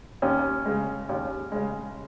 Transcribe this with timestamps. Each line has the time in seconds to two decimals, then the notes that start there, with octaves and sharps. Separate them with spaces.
0.22 D#2 C#4
0.65 C#3 G#3
1.09 D#2 C#4
1.52 C#3 G#3